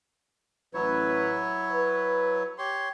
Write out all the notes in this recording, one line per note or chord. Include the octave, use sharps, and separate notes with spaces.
A1 F#3 E4 B4 C#5
B4
G4 C#5 C6